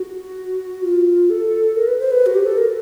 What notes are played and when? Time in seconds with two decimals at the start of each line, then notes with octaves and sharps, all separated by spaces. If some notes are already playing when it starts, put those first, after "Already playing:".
Already playing: F#4
0.84 F4
1.30 A4
1.76 A#4
1.88 B4
2.00 C5
2.11 B4
2.26 F#4
2.35 G4
2.46 A4
2.58 A#4